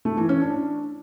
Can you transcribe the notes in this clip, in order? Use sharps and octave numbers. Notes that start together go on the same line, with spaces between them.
A3
E3
C#4
D4